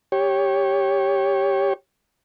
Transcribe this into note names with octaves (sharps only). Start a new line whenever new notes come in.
G4 C#5